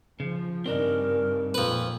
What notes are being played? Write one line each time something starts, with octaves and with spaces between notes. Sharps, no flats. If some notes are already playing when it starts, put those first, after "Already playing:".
C#3 F3
G2 C#3 C4 D4 D#4 A#4
F2 A#2 B4